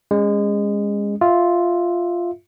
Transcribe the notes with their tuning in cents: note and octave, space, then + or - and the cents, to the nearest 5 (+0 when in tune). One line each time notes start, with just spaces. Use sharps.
G#3 -25 C#4 -5
F4 +0 E5 -10